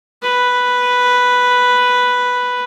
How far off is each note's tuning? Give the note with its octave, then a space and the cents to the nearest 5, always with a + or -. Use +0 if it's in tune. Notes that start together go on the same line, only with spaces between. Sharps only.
B4 +0